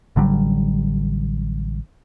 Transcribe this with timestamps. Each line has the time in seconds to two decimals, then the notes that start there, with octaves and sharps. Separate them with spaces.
0.16 A1 D3 F#3 G3